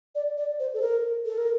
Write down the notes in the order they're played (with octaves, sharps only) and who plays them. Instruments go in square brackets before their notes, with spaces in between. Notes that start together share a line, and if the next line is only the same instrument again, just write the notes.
[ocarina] D5
D5
C5
A4
A#4
A4
A#4